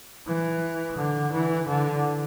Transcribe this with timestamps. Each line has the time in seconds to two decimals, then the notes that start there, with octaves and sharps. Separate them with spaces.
0.27 E3
0.97 D3
1.32 E3
1.67 D3